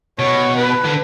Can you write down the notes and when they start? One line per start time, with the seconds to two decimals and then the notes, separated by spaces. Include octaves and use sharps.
0.18 B2 C#5
0.56 B4
0.85 D3